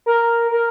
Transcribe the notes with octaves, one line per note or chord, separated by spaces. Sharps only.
A#4
A#4